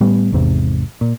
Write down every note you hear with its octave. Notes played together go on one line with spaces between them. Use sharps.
A2 G3 B3
G#1 E2 G#2 C3
A#2